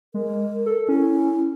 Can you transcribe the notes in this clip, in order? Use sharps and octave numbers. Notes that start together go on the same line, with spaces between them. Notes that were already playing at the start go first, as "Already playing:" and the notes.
G#3 A#4
A4
C#4 E4